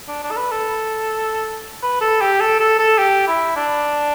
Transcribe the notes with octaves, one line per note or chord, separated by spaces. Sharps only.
D4
D4
A4
B4
A4
B4
A4
G4
A4
A4
A4
G4
E4
D4